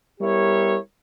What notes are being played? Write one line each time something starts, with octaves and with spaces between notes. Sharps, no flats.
G3 B3 E4 G4 A#4 C#5